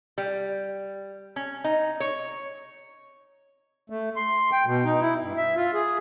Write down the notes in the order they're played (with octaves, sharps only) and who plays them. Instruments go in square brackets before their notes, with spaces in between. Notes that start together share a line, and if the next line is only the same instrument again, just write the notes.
[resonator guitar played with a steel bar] G3
C#4
D#4
C#5
[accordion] A3
C6
G5
B2
D#4
E4
G2
E5
F4
G#4